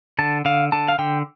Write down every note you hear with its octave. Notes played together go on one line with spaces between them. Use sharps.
D3 A5
D3 F5
D3 A5
F5
D3 G5